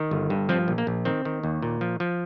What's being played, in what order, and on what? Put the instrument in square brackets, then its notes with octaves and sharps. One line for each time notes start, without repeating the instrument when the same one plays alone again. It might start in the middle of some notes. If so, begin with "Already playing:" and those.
Already playing: [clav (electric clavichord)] D#3
G1
G2
F3 C4
A#1
A#3
A#1
D#3 C4
D#3
D#2
A#2
F3
F3